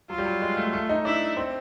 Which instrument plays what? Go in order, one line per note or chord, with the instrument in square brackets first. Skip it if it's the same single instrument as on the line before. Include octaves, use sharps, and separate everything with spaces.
[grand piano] F#3 [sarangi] F4
[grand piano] G3
F#3
G#3
A3
A3
D#4
[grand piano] D4 [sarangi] E4
[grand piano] C4